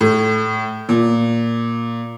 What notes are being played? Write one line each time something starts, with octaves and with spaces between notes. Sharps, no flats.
A2
A#2